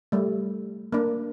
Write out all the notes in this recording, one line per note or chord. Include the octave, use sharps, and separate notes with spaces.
G3 A3
A#3 D4